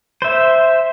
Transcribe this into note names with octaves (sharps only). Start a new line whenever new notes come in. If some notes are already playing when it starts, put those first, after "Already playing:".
C5 E5